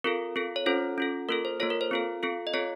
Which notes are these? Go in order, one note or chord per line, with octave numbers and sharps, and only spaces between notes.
C4 F4 A4 A#4
C4 F4 A4
C#5
C#4 F4 A4 C5
C#4 F4 A4
A#3 F4 A4 A#4
C5
A#3 F4 A4 C#5
A#4
C5
C4 F4 A4
C4 F4 A4
D#5
C4 F4 A4 C#5